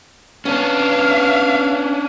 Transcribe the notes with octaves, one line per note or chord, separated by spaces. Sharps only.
B3 C#4 D4 F5